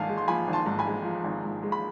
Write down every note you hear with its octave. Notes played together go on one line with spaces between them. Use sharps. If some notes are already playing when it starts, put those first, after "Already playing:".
Already playing: G#1 G#2 F3 F5 G#5 A5
G#3
C6
F3 G#5 B5
G#1
A5 C6
G#2
G#5 B5
G#3
F3
G#1
G#2
G#3
B5